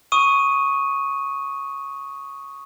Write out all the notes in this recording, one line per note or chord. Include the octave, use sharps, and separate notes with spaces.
C#6 D#6 D#7